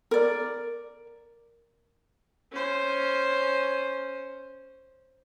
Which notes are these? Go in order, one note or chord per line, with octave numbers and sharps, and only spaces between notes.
A#4 D5
C#4 C5